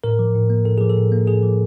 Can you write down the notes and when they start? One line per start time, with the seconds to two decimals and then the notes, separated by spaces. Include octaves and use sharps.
0.04 A2 A#4
0.19 F3
0.35 A2
0.50 A#3
0.65 A2 A4
0.78 F3 G#4
0.89 A4
0.97 A2
1.12 A#3
1.27 A2 G#4
1.43 F3